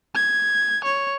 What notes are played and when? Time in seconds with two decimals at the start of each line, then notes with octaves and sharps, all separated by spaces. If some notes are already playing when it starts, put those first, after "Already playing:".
0.15 G#6
0.84 C#5